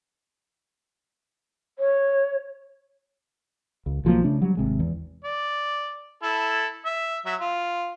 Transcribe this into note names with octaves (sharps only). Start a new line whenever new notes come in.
C#5
C#2
B1 F3 F#3 A#3
C#3 A3 D4
F#3 G3
G#1 C3 G#3
E2
D5
E4 A4
E5
F#3 E5
F4